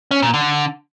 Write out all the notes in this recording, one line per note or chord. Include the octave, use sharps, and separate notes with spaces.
C#4
A#2
D3